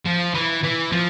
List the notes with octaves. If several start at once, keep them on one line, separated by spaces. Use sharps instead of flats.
F3
E3
E3
F3